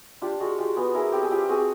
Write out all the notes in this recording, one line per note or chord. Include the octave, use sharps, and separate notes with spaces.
D4 F4 G4
G#3 F#4
G#3 F4 G4
B3 F#4 G#4
E4 G#4 A#4
C4 G4 A4
G#4
C4 F4 G4
C4 F#4 G#4